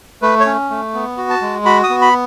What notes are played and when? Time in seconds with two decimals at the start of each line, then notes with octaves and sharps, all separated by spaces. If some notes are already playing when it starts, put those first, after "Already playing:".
0.22 A3 B4
0.40 C#5
0.46 C#4
0.70 A3
0.94 B3
1.17 F#4
1.30 A5
1.41 G#3
1.65 F#4 B5
1.83 D#6
1.89 B3
2.01 B5